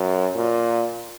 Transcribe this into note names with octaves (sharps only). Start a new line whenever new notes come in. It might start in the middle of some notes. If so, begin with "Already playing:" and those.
Already playing: F#2
A#2